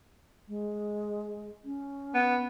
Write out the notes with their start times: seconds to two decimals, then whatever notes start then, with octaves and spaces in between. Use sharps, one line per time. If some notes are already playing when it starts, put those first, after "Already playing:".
0.49 G#3
1.65 C#4
2.14 B3